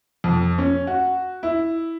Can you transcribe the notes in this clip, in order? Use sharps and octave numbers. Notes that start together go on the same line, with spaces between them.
F2
C#4
F#4
E4